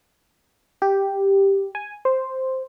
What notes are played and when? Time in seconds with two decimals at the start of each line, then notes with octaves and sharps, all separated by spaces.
0.82 G4
1.75 G#5
2.05 C5